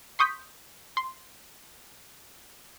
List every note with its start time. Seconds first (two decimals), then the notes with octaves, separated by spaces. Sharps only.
0.19 C6 C#6 D#6 G6 B6
0.97 C6